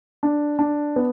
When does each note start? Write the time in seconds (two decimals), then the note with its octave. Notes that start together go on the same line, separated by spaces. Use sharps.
0.23 D4
0.59 D4
0.96 B3